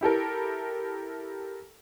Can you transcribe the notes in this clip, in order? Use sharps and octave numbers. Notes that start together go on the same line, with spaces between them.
E4 G4 A4 A#4